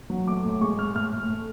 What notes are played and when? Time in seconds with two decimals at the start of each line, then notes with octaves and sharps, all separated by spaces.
0.10 F#3
0.27 A3 D6
0.45 A2
0.61 G#3 C#6
0.78 G#3 F6
0.95 A2 F6
1.12 A2
1.29 A3